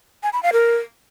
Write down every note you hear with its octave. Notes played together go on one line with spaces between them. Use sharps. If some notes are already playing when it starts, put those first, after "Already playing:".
G#5
B5
F5
A#4